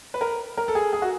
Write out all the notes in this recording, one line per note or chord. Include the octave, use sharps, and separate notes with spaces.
B4
A#4
A#4
A4
G#4
G#4
F#4